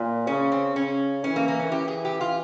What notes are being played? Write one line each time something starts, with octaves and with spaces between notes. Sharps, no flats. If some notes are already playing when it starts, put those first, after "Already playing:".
Already playing: A#2
C#3 C#4
C4
C#3 C#4
E3 C#4
A#3
A#3
C#4
E3 G4
G#4
G4
F4